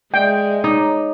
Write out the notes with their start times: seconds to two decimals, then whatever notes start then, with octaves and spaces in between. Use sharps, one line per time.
0.14 G#3 D5 E5 G5
0.64 D#4 C#5 A#5 D6